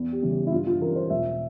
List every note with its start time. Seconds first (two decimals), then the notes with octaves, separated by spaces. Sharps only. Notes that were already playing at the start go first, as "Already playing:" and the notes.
Already playing: E2
0.12 G4
0.22 C#3 E3 G3
0.32 G4
0.47 E4
0.52 G2 F4
0.67 F4
0.81 E3 G3 C#4 A#4
0.96 C5
1.10 E1 E5